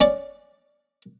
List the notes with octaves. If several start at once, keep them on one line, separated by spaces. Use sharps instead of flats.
C#4 D5